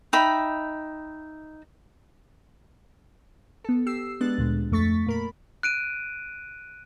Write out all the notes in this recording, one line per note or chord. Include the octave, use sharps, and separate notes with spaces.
D#4 E5 G5 B5
B3 A4
G4 E6 C7
G#3 B3 D4 F#6 A6
D2 A#2 G#3
F2 A3 C#6 A6 B6
A#2 A#4 B5
F#6 D7 D#7